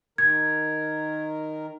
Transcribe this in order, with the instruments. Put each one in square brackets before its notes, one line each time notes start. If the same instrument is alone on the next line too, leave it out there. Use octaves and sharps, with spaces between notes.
[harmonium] D#3 A#4 [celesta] G#6